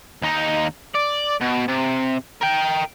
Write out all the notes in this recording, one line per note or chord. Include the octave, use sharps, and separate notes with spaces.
D#2 D#4
D5
B2
C3
A#4 G5